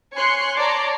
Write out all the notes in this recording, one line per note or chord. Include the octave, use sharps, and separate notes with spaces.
C#5 G#5 C6 F#6 C#7
C#5 D5 A5 A#5 C6 D6